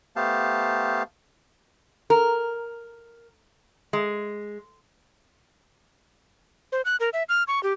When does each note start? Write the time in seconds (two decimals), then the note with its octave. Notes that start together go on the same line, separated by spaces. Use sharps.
0.16 A3 B3 G4 C5 F5 A5
2.10 A#4
3.93 G#3
6.72 C5
6.85 F#6
7.00 A#4
7.13 E5
7.29 F6
7.48 C#6
7.63 G4